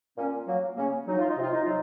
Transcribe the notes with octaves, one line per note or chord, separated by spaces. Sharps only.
A#2 A#3 C#4
F#3 A#3
C#3 A#3 C#4
F#3 D#4
F4
D#4
C3 F4
D#4
F#3 F4